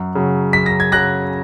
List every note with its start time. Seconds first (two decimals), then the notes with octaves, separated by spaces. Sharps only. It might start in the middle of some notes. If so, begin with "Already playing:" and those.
Already playing: F#2
0.15 C#3 F#3
0.53 F#2 B6
0.66 A#6
0.80 G#6
0.92 C#3 F#3 F#6 A#6